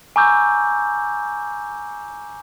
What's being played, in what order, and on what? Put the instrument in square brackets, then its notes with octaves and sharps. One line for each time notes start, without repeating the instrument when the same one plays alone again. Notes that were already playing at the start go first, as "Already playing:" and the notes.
[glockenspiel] G#5 A#5 C#6 D6 E6 G6